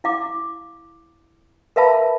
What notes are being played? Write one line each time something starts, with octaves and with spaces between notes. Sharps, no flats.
E4 F5 D6
A#4 B4 E5 F5 A5 B5